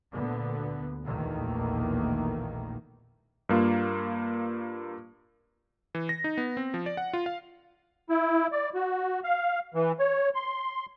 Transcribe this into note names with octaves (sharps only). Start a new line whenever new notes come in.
D2 A#2 D3 B3
A#1 E2 B2 D#3 A3 A#3
G2 A#3 F4
E3
A#6
D#4
B3
C4
F3
D5
F#5
F4
F5
E4
D5
F#4
F5
E3
C#5
C6